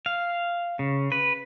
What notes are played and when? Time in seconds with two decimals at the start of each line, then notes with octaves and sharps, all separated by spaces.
0.06 F5
0.79 C#3
1.12 B4